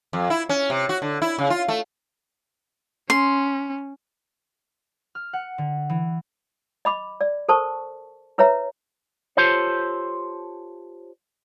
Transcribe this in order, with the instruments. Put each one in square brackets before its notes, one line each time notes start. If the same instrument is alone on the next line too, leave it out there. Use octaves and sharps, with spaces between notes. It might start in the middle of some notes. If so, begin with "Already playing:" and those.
[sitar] F2
E4
C#4
C3
F#4
D3
E4
C#3
F4
A3
[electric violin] C#4 [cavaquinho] C6
[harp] F6
F#5
D3
E3
[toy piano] D#5 B5 D6
D5
A4 A#4 C5 A5 C#6
E4 B4 C#5 E5 A#5
[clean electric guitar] F4 G4 A4 C5 C#5